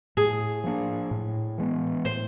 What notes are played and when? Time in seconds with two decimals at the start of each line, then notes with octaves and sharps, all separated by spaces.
0.17 A2 G#4
0.64 F3 A#3 D4
1.11 A2
1.58 E3 G#3 B3
2.05 A2 C5